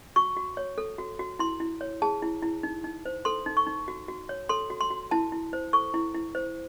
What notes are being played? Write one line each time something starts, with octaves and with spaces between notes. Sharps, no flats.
F#4 C#6
F#4
C#5
A4
F#4
F#4
E4 C6
E4
C#5
G#4 A5
E4
E4
D#4
D#4
C5
A4 C6
D#4
C#6
D#4
F#4
F#4
C#5
A4 C6
F#4
C6
F#4
E4 A5
E4
C5
A4 C#6
E4
E4
C5